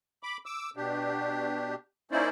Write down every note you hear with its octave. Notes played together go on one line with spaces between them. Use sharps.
B5 D6
D6 E6
B2 D4 G4
A#3 C#4 D#4 E4 C5 D5